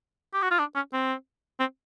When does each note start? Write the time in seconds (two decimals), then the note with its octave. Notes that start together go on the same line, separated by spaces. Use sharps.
0.34 G4
0.42 F#4
0.51 F4
0.59 D4
0.75 C#4
0.93 C4
1.60 C4